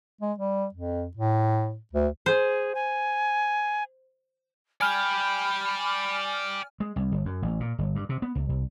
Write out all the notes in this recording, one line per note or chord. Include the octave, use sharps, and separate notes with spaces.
G#3
G3
F2
A2
D2
G#4 C5
G#5
D5 G5 G#5 B5 F6
G#3
C2
G1
F#2
A1
A#2
G1
G2
C3
B3
C#2
C2